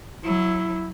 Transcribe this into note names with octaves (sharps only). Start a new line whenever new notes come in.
F#3 E4